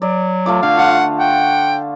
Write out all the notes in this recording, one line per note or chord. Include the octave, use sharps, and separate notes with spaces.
F#3 D5
A3 F4 D6
D3 F5
F4 F#5
F#5 G5